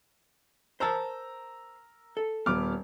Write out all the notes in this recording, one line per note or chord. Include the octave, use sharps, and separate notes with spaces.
A#4 C5 A5 A#5 E6
A4
D#1 B3 D6 F6